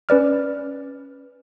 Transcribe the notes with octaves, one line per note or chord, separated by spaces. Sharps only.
C#4 B4 D5 F6